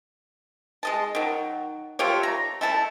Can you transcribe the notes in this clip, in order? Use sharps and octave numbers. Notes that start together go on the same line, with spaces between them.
G#3 D#5 A5
D#3 F#3
A3 F4 G4 C#5
A#5
A3 E4 A5